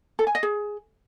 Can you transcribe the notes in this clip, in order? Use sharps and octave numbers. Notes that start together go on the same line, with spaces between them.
A4
G#5
D#5
G#4